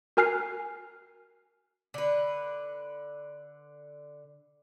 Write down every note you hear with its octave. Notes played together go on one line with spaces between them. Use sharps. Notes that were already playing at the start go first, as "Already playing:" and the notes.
F#4 A#4 G#5 F6 F#6 C7
D3 B4